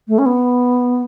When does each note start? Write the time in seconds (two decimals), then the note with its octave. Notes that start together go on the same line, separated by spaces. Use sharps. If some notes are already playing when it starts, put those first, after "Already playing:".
0.08 A3
0.18 C#4
0.26 B3